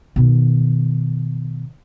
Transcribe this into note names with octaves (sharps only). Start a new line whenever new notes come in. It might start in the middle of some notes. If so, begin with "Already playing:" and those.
B2 D#3